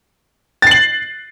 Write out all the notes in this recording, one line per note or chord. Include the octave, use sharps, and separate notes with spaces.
A6 C7 F#7